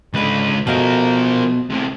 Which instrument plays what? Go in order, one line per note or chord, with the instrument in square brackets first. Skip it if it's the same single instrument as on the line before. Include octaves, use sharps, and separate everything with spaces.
[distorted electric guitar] C#2 B4 [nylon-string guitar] G#2 D3
[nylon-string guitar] B2 A3 [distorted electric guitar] F3 A#4
[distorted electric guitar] A2 C3